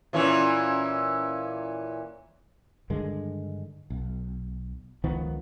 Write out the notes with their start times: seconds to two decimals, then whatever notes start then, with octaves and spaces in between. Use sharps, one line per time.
0.13 A#2 E3 C#4
2.90 G2 D3 D#3 G#3
3.90 B1
5.04 C#2 D#3 F3 B3